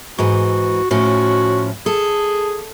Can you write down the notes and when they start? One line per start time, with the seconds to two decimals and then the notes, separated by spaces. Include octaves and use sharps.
0.18 G#2 E3 F#4
0.91 A2 F3 C#4 F#4
1.86 G#4 A4